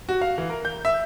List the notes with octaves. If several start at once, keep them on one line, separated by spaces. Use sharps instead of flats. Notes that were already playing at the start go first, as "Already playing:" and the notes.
F#4
F5
E3
A#4
G6
E5